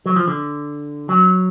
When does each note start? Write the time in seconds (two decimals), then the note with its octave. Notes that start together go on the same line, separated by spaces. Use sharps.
0.06 F#3
0.16 F3
0.28 D3
1.09 F#3